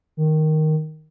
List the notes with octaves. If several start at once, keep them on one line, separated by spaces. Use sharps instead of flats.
D#3